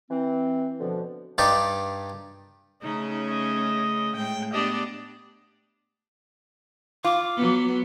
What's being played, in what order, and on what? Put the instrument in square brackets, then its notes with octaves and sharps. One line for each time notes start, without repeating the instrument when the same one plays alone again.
[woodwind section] E3 C4
B2 D3 F3
[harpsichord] G2 D4 D#4 G4
[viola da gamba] C#3 A3 C#4 [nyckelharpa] D#4
[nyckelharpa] D#5
[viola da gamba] A2 G#3 [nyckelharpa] G5
[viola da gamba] B3 D4 G4 [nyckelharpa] D#5
[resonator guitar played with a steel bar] F4 [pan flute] D6
[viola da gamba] F#3 B3